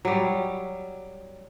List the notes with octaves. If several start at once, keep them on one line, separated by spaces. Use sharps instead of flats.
F#3 G3